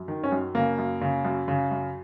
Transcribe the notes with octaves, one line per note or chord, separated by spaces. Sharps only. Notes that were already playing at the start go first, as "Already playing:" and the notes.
Already playing: F#2
D#3
C#4
F#2
C#3 A#3
F#2
C#3
F#2
C#3
F#2